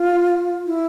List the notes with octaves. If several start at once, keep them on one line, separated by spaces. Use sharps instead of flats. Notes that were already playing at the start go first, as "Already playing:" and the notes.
Already playing: F4
E4